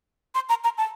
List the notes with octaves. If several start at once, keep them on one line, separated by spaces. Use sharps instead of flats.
C6
A#5
A#5
A5